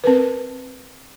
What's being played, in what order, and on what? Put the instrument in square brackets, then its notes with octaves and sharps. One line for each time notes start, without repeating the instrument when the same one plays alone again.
[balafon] C4 A#4 B4